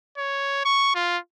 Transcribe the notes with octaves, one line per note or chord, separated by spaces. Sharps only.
C#5
C#6
F4